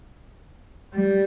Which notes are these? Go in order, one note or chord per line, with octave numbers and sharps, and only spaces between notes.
G3